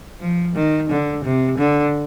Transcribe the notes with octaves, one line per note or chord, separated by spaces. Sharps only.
F3
D#3
D3
C3
D3